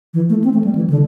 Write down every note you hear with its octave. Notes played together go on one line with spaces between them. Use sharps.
E3
A3
C4
A3
G3
E3
D3